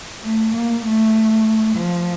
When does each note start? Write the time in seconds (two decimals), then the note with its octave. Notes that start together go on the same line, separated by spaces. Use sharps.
0.24 A3
0.54 A#3
0.85 A3
1.76 F3